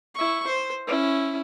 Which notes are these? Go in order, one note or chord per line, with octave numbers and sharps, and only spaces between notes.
E4 C#6
C5
C#4 E4